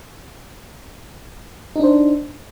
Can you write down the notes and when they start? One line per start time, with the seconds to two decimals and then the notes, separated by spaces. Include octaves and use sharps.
1.76 D#4
1.80 D4
1.83 C5